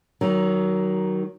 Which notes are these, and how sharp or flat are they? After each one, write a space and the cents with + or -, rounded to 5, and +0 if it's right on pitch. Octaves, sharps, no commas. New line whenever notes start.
D#3 +0 F#3 +25